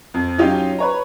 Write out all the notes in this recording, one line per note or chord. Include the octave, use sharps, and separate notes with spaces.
F2
F#3 C#4 D#4 F4 G4
B4 C#5 A#5